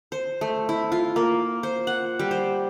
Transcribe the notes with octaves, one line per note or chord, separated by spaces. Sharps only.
C5
A3
E4
F4
A#3
C5
F#5
G3
C5